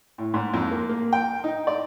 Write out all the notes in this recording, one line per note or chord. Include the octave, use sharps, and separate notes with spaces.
A2
G#2
F2
A#3
A#3
G5
D#4
D5